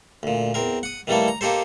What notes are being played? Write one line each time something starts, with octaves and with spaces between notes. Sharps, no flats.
D2 A#2
E2 C4 A#4
F#5 D#6
D#3 E3 G3 A3 A#3 A4
A#5
A#3 D#4 G4 A4 C5